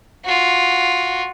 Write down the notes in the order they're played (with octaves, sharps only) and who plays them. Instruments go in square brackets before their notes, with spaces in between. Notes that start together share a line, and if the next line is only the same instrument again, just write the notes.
[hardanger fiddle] F4 F#4